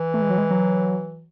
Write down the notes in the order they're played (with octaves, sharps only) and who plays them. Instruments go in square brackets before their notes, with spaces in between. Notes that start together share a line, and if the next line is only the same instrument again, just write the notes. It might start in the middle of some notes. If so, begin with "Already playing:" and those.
Already playing: [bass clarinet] E3
[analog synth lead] A3
G#3
F#3
G#3
F#3